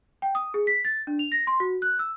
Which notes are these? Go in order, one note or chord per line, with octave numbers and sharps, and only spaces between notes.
G5
D#6
G#4
B6
A6
D4
F7
A#6
C6
F#4
F#6
E6